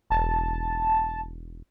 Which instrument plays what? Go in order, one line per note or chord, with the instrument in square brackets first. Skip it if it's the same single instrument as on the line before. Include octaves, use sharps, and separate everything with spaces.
[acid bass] E1 [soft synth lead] A5